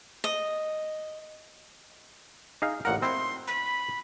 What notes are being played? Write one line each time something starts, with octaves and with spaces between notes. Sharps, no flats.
D#5
D#4 G#4 F5
A1 A#2 A#4 F#5
C4 E4 C6
B5